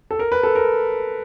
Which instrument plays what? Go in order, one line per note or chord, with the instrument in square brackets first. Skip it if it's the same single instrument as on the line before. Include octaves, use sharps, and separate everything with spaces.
[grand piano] A4
A#4
B4
A4
A#4